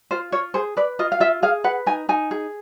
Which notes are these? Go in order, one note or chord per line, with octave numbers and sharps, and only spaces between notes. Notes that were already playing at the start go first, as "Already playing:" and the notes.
F4 C5
F4 C#5
G#4 C5
B4 D5
F4 D#5
F5
F4 E5
G#4 F5
B4 F#5
D#4 G#5
D#4 G#5
G#4